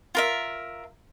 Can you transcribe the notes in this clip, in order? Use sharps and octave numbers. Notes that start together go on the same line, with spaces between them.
F4 A#4 E5